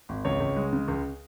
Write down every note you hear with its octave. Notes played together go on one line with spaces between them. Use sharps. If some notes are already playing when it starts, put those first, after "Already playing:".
G#1
C#2 C#5
C#2
G#3
C#3
C#2